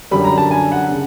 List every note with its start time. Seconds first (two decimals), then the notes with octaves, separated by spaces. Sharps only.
0.11 F#2 D3 G3 B5
0.24 A#5
0.38 A5
0.51 G#5
0.72 F#5
0.91 C#3